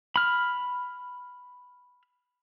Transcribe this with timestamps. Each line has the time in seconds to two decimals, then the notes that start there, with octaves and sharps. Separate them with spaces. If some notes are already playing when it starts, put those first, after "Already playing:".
0.16 B5 F6